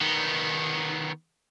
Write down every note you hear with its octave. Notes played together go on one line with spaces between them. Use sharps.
D#3 B3